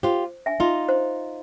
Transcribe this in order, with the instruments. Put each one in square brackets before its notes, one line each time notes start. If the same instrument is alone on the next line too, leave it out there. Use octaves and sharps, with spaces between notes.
[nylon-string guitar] F4 G4 [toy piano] C5
[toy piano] E5 G#5
[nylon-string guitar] D#4 F4
[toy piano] C5